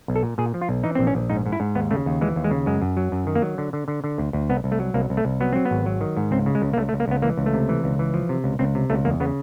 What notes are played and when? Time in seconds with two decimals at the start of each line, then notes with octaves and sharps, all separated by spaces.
0.08 B1
0.16 A4
0.23 A#2
0.38 A#2 G#4
0.54 F3
0.61 F4
0.69 B1
0.84 E3 D#4
0.95 A#1 C4
1.07 C#4
1.15 A#1
1.30 G#2 D#4
1.46 G#2
1.52 E4
1.60 G#2
1.75 D#2 B3
1.91 C#3 A3
2.06 D#2
2.21 E3 G#3
2.36 D#2
2.44 G#3
2.51 C#3
2.66 F#2 G#3
2.82 F#2
2.97 F#3
3.12 F#2
3.27 D#3
3.35 A#3
3.42 F#3
3.58 D3
3.73 D3
3.88 D3
4.04 D3
4.18 D2
4.33 D2
4.49 C2 B3
4.64 C2
4.72 A3
4.80 F#3
4.94 C2 A#3
5.10 C2
5.17 A3
5.25 C2
5.40 F#3 B3
5.53 F#3 C4
5.65 B3
5.71 G#1
5.86 F#3
6.01 D#3
6.17 G#2
6.31 C#2 C4
6.46 C#3
6.55 G#3
6.62 C#2
6.73 A#3
6.77 C#2 A3
6.89 A3
6.93 C#2
7.00 A#3
7.08 C#2 B3
7.22 E3 A#3
7.37 C#2
7.46 A3
7.54 C3
7.69 E3
7.84 C#2
7.99 E3
8.14 F3
8.29 C3
8.44 C#2
8.59 C#2 C4
8.75 C3
8.90 C#2 A3
9.05 E2 A#3
9.20 C#3 B3